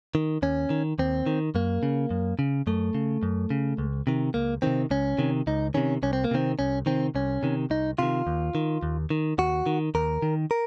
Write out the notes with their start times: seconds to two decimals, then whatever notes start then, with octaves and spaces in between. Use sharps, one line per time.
0.15 D#3
0.42 D#2 C#4
0.70 D#3
0.99 D#2 C4
1.26 D#3
1.55 F#2 A#3
1.83 C#3
2.11 F#2
2.39 C#3
2.67 F#2 A3
2.94 C#3
3.23 F#2
3.50 C#3
3.78 C#2
4.07 C3 D#3
4.34 C#2 A#3
4.62 C3 D#3 C4
4.91 C#2 C#4
5.19 C3 D#3
5.47 C#2 D#4
5.74 C3 D#3 C#4
6.03 C2 C#4
6.13 C4
6.24 A#3
6.31 C3 D#3 C4
6.59 C2 C#4
6.86 C3 D#3 C4
7.15 C2 C#4
7.43 C3 D#3
7.70 C2 D#4
7.98 C3 D#3 F4
8.27 D#2
8.55 D#3
8.83 D#2
9.10 D#3
9.38 D#2 F#4
9.66 D#3
9.95 D#2 A#4
10.22 D#3
10.51 A#4